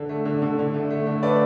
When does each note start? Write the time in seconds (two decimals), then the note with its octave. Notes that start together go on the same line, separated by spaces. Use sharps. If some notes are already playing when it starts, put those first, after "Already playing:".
Already playing: D3
0.09 A3
0.25 D3
0.42 D3
0.59 D3
0.74 A3
0.90 A3
1.07 D3
1.23 A3 B4 D5